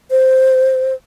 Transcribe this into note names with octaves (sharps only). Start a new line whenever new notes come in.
C5